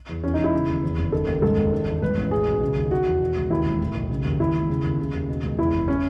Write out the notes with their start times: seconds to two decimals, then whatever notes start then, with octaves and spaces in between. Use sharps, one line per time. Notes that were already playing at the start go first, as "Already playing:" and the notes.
0.09 E2
0.24 E2 C#4
0.34 D#4
0.38 E1
0.44 E4
0.54 C#3
0.68 D#2
0.83 E2
0.97 F#1
1.12 D#3 A4
1.27 D#2
1.42 G#2 A4
1.57 G#1
1.72 D#3
1.87 E2
2.02 G#2 B4
2.17 A1
2.31 B2 G#4
2.46 B1
2.61 C#3
2.76 D#2
2.91 D#3 F#4
3.06 E2
3.20 B2
3.36 C#2
3.50 D#2 E4
3.66 E1
3.81 A2
3.95 B1
4.10 C#3
4.25 D#2
4.40 D#2 E4
4.55 E1
4.69 C#3
4.84 D#2
4.99 C#3
5.15 D#2
5.29 B2
5.44 C#2
5.59 E2 E4
5.74 F#1
5.88 C#4